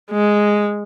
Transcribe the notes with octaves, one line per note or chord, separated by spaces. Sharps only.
G#3